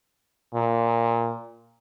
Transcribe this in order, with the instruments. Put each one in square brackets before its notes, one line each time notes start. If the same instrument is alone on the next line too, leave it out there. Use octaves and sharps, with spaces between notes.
[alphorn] A#2